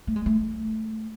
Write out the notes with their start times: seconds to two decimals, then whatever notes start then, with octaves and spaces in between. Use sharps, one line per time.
0.07 A3
0.16 G#3
0.26 A3